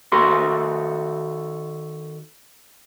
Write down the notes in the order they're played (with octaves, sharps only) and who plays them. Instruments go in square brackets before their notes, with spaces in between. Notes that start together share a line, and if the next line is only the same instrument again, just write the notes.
[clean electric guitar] D#3 F#4 A4 C6